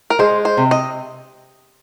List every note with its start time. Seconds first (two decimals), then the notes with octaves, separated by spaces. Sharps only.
0.10 A#4
0.19 G#3 C5
0.45 C5
0.57 C3
0.71 D#5